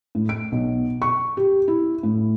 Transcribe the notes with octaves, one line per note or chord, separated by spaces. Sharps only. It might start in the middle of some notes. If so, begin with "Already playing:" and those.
A2
D7
B1
C#6
G4
E4
A2